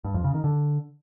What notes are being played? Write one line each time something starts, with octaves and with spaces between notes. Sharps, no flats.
G2
F2
C#3
D#3
D3